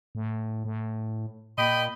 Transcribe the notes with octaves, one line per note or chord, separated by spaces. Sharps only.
A2
A2
A#2 D#5 G5 B5